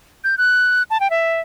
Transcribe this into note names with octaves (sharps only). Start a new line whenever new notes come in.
G6
F#6
A5
G5
E5